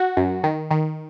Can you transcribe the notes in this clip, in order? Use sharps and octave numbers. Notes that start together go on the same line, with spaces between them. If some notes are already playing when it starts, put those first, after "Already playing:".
Already playing: F#4
F#2
D#3
D#3